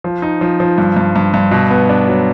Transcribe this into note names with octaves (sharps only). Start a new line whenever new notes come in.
F3
D#4
F3
F3
G2
G2
G2
G2
B2
B3
D4
F#3